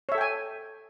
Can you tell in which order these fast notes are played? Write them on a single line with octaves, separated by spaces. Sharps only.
C#5 E5 A4 G5 G#5